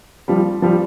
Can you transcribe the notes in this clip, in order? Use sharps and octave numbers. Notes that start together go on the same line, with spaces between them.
F3 G3
F3 G3